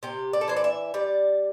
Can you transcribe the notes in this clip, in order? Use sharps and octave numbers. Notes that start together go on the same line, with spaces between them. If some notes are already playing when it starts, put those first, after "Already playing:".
C3 G4
D5
A4
E3 C5
D5
E5
G3 D5